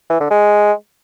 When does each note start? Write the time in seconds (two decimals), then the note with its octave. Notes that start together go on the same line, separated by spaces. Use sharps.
0.10 E3
0.20 D3
0.31 G#3